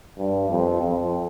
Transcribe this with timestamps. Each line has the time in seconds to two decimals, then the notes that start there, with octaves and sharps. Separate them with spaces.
0.18 G2
0.50 F2
0.81 F2